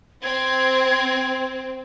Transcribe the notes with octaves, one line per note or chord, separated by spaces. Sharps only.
C4 G#6